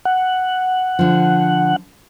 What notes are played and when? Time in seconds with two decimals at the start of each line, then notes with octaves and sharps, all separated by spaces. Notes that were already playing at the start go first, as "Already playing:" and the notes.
0.05 F#5
0.99 D3 F3